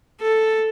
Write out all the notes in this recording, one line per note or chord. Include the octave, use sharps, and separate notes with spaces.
A4